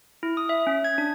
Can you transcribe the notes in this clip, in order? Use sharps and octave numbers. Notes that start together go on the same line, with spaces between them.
E4
D#6
E5
C#4
G#6
D4